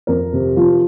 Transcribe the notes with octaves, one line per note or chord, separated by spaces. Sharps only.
F2 A#4
C3
F3